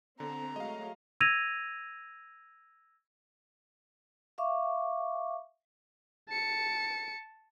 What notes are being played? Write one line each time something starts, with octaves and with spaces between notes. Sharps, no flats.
D3 C4 A4 A#5
F#3 G#3 A3 D#5 F5
E6 G#6 A#6 D#7 F7
E5 F5 C#6 D6
A5 C#7